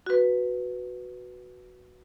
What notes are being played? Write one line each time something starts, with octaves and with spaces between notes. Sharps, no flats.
F#4 B4